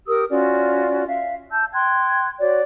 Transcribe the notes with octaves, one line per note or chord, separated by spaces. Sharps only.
G4 A#4 D#6 E6
C#4 F4 F#4 D5
E5 F5
A5 E6 G6
G5 C6 F#6 G#6
F#4 C#5 D5